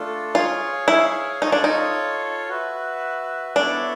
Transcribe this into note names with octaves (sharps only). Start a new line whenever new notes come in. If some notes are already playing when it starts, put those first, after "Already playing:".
Already playing: A3 D4 F4 A4
F4 G#4 C#5 F5
E4
D#4 F4 A4 C#5
D4
D#4
F#4 B4 E5
B3 D4 E4 A4 C#5 E5